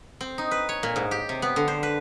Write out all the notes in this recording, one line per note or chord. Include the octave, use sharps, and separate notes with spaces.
C4
D#4
B4
C#5
A#2
G#2
G4
C3
B3
D3
C5
B4